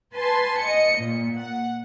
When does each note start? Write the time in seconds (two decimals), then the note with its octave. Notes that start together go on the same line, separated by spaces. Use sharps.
0.15 B4 G#5 A5 C6
0.61 D#5 C#7
0.98 A#2
1.37 F#5